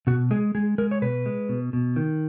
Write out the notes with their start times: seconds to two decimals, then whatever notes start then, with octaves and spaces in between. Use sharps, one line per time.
0.07 B2 F#4
0.31 G#3 G#4
0.55 G#3 G#4
0.78 G#3 A#4
0.91 C#5
1.02 B2 B4
1.26 G#3
1.49 B2
1.73 B2
1.96 D#3